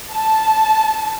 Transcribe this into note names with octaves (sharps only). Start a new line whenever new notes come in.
A5